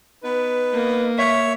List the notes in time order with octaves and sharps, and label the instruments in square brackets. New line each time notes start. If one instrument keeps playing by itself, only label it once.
[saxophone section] B3 D#4 B4
[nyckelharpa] A#3
[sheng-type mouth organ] C#5 [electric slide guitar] E5